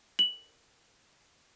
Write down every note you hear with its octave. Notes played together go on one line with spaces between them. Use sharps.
F#7